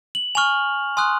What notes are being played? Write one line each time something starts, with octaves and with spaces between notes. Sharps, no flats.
F#7
G#5 C#6 F6 F7
G#5 C6 D#6 F#6